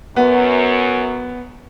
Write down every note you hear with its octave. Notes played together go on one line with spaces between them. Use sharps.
F#2 B3